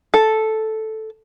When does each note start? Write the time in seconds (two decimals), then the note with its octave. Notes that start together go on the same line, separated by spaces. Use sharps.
0.14 A4